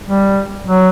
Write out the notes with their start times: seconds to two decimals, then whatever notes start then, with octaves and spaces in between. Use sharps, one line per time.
0.04 G3
0.65 F#3